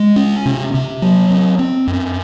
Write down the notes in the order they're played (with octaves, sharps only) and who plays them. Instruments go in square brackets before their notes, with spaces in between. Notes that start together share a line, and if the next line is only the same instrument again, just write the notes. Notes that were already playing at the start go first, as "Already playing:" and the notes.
Already playing: [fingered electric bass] G#3
C#4
C3
C3
F#3
C4
C4
F#2